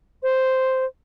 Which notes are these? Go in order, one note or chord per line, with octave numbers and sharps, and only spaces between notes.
C5